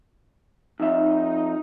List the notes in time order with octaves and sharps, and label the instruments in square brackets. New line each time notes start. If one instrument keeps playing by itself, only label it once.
[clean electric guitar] F2 E5 [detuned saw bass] D#4